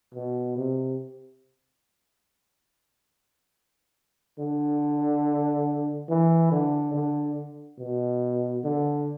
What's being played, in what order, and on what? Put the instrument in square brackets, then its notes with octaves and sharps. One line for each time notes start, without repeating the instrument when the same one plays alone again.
[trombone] B2
C3
D3
E3
D3
D3
B2
D3